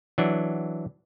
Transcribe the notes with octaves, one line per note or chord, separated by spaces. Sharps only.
E3 F#3 D4